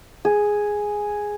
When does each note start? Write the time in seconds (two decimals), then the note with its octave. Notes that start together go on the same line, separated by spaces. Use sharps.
0.25 G#4